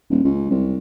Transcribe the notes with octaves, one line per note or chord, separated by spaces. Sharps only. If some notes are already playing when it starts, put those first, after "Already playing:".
D#1
C#2
C2